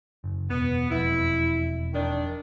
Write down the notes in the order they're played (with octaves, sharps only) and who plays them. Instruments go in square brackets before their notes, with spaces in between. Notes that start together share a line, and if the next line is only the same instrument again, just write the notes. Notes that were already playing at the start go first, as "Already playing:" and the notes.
[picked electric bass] F#1
[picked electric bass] E1 [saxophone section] B3
[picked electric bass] E1 F2 [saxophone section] E4
[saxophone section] D#3 D4